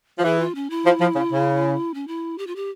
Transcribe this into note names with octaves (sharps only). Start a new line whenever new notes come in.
F3
E3 G#4
F4
C#4
E4
F3
F3
C#3
C#3
C#4
E4
G4
F4
G4